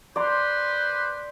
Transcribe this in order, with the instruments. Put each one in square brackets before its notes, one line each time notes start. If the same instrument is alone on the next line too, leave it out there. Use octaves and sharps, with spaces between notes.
[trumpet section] B4 C5 [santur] D5 A#5 C6